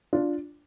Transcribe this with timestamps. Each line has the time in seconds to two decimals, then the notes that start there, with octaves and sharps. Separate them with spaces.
0.13 D4 F4